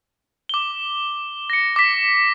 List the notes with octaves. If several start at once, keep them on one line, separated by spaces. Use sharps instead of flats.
D6 G7
A#6 C#7
D6 B6